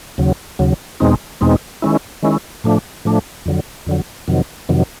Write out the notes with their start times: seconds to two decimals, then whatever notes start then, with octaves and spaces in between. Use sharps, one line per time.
0.18 D#2 C#3 F#3
0.59 D#2 C#3 F#3
1.00 E2 B2 G#3 C4 D#4
1.41 E2 B2 G#3 C4 D#4
1.82 D#3 G#3 C#4 E4
2.23 D#3 G#3 C#4 E4
2.64 A2 F3 A3 D4
3.05 A2 F3 A3 D4
3.46 F2 D3 F#3
3.86 F2 D3 F#3
4.28 F2 C3 D#3 F#3
4.69 F2 C3 D#3 F#3